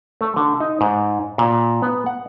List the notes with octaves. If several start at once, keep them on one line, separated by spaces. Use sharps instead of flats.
A3
D3
D#4
G#2
A#2
B3
F#5